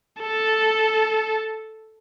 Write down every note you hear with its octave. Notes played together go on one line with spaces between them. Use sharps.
A4